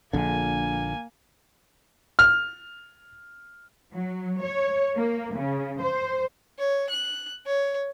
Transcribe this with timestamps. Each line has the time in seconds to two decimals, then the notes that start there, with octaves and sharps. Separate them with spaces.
0.13 A#1 D3 A#3 G#5
2.19 F6
3.93 F#3
4.43 C#5
4.95 A#3
5.35 C#3
5.81 C5
6.59 C#5
6.90 F#6
7.46 C#5